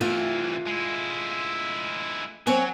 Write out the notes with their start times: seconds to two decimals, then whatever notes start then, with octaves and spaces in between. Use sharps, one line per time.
0.01 C2 E3 A3 F4
0.67 G#3 E4
2.47 F#3 C4 C#5 G#5